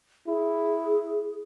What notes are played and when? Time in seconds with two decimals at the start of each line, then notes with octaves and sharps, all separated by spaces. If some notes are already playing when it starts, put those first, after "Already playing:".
0.27 E4 G#4